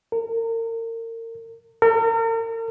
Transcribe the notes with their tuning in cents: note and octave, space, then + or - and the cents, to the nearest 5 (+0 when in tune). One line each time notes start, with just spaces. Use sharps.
A#4 -35
A#4 -40